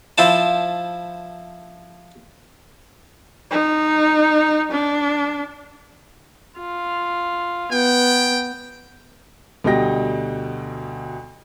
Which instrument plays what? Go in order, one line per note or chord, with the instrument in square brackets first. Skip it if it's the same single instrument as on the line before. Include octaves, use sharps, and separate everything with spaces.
[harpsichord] F3 E4 C5 A5
[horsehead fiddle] D#4
D4
[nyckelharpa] F4
[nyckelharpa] B3 [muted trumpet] G5
[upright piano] D2 B2 G3 D#5 G5 A#6